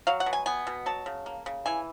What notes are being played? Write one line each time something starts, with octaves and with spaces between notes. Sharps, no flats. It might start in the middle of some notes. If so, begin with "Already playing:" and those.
F#3 F5
F#5
B2
G#5
B3 G#5
B2
F#3 A5
C#3
A#3
C#3
E3 G#5